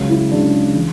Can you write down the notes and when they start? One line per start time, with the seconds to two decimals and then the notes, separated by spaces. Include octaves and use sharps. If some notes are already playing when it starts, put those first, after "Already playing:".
Already playing: C#2 C#3 F#3
0.09 E4
0.31 C#2 C#3 F#3 D4
0.75 E3